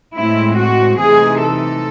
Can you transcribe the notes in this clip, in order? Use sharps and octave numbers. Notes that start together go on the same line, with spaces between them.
A2 G#3 C4 E4
F#4
C3 E3 A3 D#4 G#4
A4